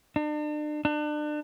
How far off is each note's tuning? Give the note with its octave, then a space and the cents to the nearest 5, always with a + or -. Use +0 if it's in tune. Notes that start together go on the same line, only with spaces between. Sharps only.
D4 +40
D4 +35